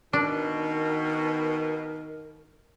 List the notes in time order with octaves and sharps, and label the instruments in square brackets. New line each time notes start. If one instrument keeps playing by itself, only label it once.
[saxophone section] B2 [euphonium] D#3 [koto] D4 [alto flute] A#4